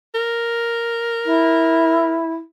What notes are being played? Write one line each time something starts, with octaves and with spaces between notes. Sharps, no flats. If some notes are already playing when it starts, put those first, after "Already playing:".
A#4
E4